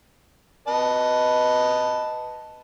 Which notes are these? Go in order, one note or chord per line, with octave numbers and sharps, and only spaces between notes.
B4 D#5 A5